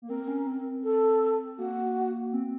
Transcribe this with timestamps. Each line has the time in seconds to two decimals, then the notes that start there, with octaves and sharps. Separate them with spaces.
0.02 A#3
0.09 C4 A#4
0.28 C#4
0.47 C4
0.84 A4
1.58 A#3 F#4
2.33 C4